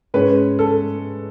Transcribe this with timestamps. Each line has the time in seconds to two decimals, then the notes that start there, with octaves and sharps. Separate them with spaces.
0.14 G#2 G#3 C#4 B4
0.59 A4